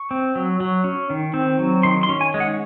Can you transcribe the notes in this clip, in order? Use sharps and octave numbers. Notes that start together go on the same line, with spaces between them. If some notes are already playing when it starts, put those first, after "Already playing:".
Already playing: C#6
C4
F#3
F#3
C#4
D#3
C4
F#3
D#3 C6
C6
C#4
G#5
G#3
F#5